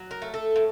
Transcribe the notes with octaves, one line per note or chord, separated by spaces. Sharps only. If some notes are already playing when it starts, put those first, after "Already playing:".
Already playing: F#3
A#4
A3
A4
A2